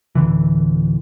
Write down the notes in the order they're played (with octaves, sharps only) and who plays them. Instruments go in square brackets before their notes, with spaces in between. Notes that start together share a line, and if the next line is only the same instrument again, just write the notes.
[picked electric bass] D1 B1 D3 E3